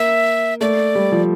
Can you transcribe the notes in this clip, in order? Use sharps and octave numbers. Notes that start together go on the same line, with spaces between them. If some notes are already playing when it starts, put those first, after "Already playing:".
Already playing: A#3 E5
A3 D5
G3
F3